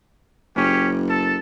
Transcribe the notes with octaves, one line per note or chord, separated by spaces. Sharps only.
F#1 C#4 G4
A4 A5